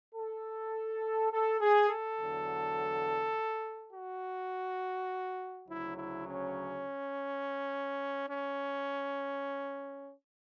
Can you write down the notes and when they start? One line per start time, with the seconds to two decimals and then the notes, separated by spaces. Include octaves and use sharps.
0.15 A4
1.32 A4
1.60 G#4
1.89 A4
2.18 E2 D3 F#3
3.93 F#4
5.68 D2 C#3 F#3 E4
5.97 E4
6.26 C#4
8.30 C#4